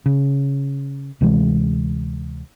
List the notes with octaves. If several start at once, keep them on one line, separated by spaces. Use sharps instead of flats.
C#3
D2 C3 E3 G#3